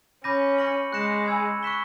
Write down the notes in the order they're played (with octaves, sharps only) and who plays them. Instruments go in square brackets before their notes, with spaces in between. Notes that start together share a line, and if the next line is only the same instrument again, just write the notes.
[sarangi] C#4 [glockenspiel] B5 D6 G6 A#6 D#7
[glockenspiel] C#6 F6 A#6 C#7 F#7
[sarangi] G#3 [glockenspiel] F#6 A#6 C#7 E7
[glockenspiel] G#5 B5 E6 G#6
C#6 F#6 B6 E7 G7